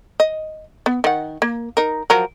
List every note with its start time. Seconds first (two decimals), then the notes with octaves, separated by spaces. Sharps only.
0.20 D#5
0.86 B3
1.04 D#3 F#5
1.42 A#3
1.77 D#4 A#4
2.10 F3 F#3 A#4